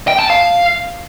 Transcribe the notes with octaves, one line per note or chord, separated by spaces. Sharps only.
G5
A5
F5